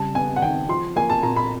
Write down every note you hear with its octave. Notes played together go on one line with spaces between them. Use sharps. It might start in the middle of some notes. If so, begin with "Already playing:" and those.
Already playing: C#3 G3 A5
B3 G#5
F#5
D#3 G5
F3 C6
A#3 G#5
A5
A#2 A#5
B5